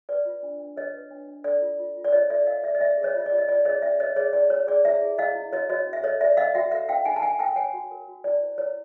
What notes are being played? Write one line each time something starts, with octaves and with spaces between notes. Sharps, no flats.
B4 D5
F4
D4
D4
B4 C#5 D#5
B4
D4
D4
A4 D5
F4
F4
F4
D5
F4 C#5 D#5
A4 D5 E5
C#5 D#5 F5
C#5 D5 E5
D#5
C#4 D5 E5
G#4
C#5 D#5
F4 D#5
D5
F4
D#5
F4 D5
G#4 C#5 D#5
C#4 D5 E5
B4 C#5 D#5
G#4 C#5 D#5
E4 D5
C#5
G#4 D5
E4 D5 E5
G#4
E4 D#5 F5
E4
F#4 C#5 D#5
F#4 C#5 D#5
C#4
E5
A4 C#5 D#5
C#5 D5 E5
C#4 D#5 F5
F#4 E5 F#5
A4 E5 F#5
D#4 F5 G5
D#4 F#5 G#5
A5
D#4 F#5 G#5
A#4 G5 A5
C#5 F#5 G#5
F#4
A#4
F#4
E4 D5
C5
E4 C#5